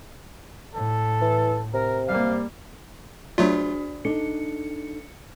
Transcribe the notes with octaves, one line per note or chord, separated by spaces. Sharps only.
A2 A4
E3
C3 A#4
G3 A#3 F5
F#3 A3 D4 F4 F#4 D5
D4 D#4 A4 C#7